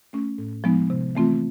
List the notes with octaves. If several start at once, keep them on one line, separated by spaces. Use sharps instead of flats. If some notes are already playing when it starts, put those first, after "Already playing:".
A3 C#4
A2
F3 G#3 B3 D#4
C3
E3 A3 C4 F4